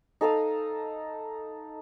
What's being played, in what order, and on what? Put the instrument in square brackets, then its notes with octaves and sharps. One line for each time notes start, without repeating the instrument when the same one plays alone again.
[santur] D#4 A4 F5 D#6